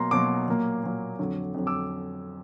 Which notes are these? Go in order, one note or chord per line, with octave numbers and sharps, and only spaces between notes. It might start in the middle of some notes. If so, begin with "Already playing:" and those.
Already playing: B2 F#3 A#3 A#5 C6
B2 F#3 A#3 C6 D6
A#2 F#3 A#3
A#2 F#3 A#3
F2 D3 F#3
F2 D3 F#3
D6 E6